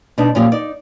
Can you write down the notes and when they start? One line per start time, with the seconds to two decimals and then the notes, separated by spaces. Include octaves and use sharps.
0.18 B2 B3 D4 D#4
0.35 F#2 A#2 F3 F4 G4
0.52 D#4 D5